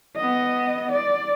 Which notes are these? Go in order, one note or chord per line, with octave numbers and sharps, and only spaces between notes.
B3 D#5
D5